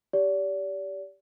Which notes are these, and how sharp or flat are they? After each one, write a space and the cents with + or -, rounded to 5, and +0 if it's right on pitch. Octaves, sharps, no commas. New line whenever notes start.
G4 +0 D5 -35